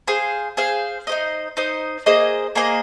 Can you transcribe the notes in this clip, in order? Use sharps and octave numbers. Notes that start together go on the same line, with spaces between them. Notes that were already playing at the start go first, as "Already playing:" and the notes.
G#4 C5 F5
G#4 C5 F5
D#4 C5 D#5
D#4 C5 D#5
A#3 G#4 C5 D#5
A#3 G#4 C5 D#5